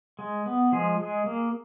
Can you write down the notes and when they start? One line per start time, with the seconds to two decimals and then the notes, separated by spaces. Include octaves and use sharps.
0.19 G#3
0.46 B3
0.72 F3 G#3 G#4
0.99 G#3
1.26 A#3